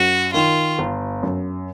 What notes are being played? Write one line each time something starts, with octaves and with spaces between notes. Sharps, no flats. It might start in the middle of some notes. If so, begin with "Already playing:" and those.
Already playing: F#2 F#4
D#3 F4
G1
F#2